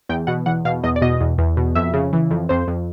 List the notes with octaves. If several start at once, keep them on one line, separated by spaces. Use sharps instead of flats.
E2 G5
B2 F#5
E2 F#5
B2 F5
E2 D#5
D5
B2 D#5
E2
E2
B2
F2 E5
C#3
E3
F2
F2 C5
F2